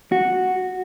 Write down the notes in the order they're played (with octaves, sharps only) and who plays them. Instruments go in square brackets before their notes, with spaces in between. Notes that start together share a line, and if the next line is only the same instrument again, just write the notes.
[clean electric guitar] F#4